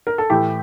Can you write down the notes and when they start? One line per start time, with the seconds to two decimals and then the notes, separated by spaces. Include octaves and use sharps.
0.07 A#4
0.18 A4
0.30 A2 E3 A3 E4 G4